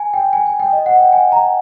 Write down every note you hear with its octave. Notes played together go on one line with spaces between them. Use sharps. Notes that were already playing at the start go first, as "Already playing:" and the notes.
Already playing: G#5
G5
G#5
G#5
G5
D#5
F#5
G5
G#5
A#5